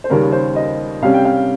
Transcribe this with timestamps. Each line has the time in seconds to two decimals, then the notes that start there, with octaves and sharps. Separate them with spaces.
0.04 C5
0.10 D#2 C#3 G3 C#4 A#4
0.32 C5
0.56 D#5
1.02 C3 G3 C#4 F5
1.14 G5
1.25 F5